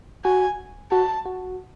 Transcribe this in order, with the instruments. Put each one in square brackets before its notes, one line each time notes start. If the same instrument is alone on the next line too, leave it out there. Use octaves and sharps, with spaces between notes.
[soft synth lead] F#4 [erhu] G#5
[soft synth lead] F#4 [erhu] A5
[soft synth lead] F#4